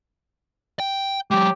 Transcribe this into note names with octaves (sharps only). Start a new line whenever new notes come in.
G5
F#3 G#3 G4